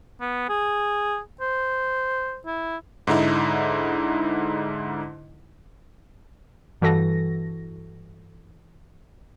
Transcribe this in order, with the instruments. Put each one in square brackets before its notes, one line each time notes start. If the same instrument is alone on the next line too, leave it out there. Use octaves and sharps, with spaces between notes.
[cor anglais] B3
G#4
C5
E4
[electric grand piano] G#2 D3 D#4 E4
[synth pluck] G2 E3 F#4 A4 A#6